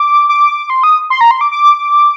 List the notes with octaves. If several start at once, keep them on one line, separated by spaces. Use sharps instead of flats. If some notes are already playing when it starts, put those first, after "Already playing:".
Already playing: D6
D6
C6
D#6
C6
A#5
C6
D6
D6